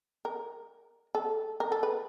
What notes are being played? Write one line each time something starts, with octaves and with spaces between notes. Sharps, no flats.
A#4
A4
A#4
A4
B4